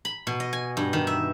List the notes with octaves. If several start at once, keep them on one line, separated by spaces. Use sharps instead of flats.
B5
B2
D#5
G#5
G2
D#3
E5